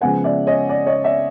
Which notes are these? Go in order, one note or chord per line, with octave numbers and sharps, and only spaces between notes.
C#3 F3 G#3 B3 F#5 G#5
D5 E5
C#5 D#5
D5
C#5 D#5
D5 E5